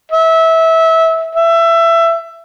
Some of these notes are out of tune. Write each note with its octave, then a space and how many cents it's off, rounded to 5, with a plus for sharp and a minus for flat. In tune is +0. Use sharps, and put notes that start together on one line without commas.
E5 -20
E5 +20